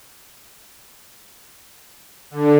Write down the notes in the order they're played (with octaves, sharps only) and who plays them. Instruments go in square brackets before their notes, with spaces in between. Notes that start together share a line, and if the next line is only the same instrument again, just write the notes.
[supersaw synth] D3